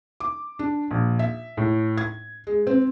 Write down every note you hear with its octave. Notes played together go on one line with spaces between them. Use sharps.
D6
D4
A#1
E5
A2
G#6
G#3
C4